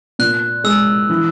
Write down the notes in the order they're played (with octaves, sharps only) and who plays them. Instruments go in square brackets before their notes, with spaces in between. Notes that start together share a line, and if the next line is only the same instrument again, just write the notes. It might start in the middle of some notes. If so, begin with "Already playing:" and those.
[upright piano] A#2 [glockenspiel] F#6
[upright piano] G#3 [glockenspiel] E6
[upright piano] E3